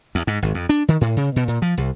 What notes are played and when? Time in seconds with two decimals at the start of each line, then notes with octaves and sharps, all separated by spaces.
0.15 E2
0.27 G#2
0.42 G#1
0.54 F2
0.69 D4
0.88 D#3
1.01 A2
1.17 C#3
1.36 B2
1.48 A#2
1.62 F3
1.77 C2